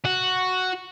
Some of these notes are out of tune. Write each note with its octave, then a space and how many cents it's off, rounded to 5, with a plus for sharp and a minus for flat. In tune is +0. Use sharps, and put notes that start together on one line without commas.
F#4 +0 F#5 +0